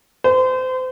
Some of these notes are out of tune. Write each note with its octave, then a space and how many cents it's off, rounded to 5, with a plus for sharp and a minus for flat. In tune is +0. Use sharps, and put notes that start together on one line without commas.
C5 -35